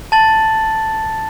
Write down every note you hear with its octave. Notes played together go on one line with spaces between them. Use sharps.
A5 A6 F#7